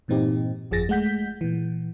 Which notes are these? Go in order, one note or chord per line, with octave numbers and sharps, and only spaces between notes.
G2 A#2 E3 C4 D#4 G4
G1 F2 F3 G#4 A6 A#6
G#3 A3 F#5 G6 B6
A#2 E3